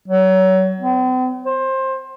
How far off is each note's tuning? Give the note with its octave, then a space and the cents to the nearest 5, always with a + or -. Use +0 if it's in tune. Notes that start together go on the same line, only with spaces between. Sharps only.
F#3 +25
C4 -45
C5 +20